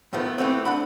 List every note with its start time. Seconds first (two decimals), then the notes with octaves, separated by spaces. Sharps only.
0.13 A2 D#3 F3 A3 B3
0.38 E3 A3 B3 C4
0.65 D4 F#5 B5